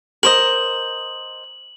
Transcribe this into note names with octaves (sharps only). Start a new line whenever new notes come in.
A#4 C5 D#5 F#7